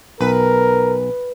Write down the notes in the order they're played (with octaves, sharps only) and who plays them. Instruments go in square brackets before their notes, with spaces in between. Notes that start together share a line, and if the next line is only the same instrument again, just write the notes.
[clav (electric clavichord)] B1 [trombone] A#4 [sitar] B4